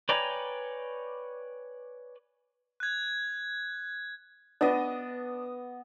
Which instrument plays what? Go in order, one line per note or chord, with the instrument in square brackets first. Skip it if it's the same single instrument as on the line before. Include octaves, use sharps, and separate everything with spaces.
[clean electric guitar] B4 C#5 D5 G5 G#5 A#5
[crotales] F#6 G#6
[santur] B3 D#5 [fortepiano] D4